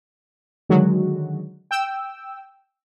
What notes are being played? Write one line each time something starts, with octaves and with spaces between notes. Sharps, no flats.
D3 D#3 F#3 G#3 F#4
G5 E6